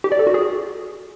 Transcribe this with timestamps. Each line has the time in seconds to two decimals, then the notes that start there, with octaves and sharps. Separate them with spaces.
0.04 G4
0.12 D5
0.19 A4
0.27 F#4
0.34 G#4